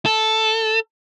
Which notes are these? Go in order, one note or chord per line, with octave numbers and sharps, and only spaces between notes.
A4